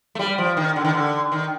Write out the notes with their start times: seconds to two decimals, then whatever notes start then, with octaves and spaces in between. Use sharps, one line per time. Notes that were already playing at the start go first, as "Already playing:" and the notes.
0.15 A3
0.19 G3
0.38 F3
0.57 D#3
0.76 D3
0.84 D#3
0.93 D3
1.32 D#3